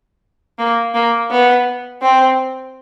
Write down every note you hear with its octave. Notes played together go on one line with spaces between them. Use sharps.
A#3
A#3
B3
C4